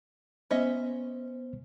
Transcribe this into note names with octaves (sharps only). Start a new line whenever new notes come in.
B3 C#4 C5 D#5 E5